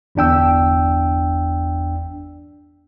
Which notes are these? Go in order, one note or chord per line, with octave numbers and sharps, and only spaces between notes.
G1 E2 D4 G5 E6